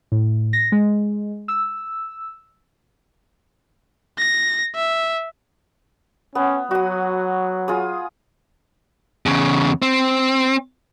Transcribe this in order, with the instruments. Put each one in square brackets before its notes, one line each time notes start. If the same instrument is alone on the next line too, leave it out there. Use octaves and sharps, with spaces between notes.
[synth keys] A2
A#6
G#3
E6
[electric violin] A#6
E5
[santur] B3 [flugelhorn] C#4
[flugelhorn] F#3 [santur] F#4 D#6
[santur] F4 G#4 D#6
[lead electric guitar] E2 C#3
C4